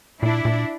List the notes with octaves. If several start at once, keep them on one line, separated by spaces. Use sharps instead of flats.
A#2 D4 E4
A#2